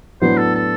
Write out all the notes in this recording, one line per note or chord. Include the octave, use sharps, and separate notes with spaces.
A2 F#3 B3 D4 C5
A4
A4